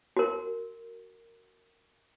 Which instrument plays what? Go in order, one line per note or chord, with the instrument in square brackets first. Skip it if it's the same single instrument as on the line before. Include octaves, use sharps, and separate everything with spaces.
[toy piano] F#4 A#4